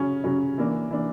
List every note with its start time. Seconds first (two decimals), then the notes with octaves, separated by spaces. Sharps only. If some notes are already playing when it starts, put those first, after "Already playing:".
Already playing: C#3 F#3 C#4
0.24 C#3 F#3 C#4
0.58 E3 A#3 D4
0.91 E3 A#3 D4